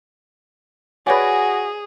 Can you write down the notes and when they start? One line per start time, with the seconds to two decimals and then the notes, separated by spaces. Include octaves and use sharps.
1.07 F#4 G#4 B4 C#5 D5 G#5 A#6